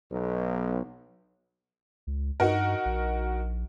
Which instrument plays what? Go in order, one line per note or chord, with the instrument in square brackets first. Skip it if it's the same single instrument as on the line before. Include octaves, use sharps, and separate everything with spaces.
[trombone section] B1
[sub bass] C#2
[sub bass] G2 [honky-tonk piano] D#4 F#4 A#4
[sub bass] A#1